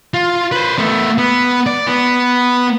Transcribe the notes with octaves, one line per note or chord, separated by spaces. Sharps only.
F4
B4 C5
A3 B3
B3
D5
B3